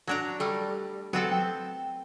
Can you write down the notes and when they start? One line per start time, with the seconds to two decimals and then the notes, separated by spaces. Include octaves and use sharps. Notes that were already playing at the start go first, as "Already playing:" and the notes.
0.07 F#3 D4 A#5
0.40 G3 A3
1.13 F#3 B3 C4 A4
1.32 G5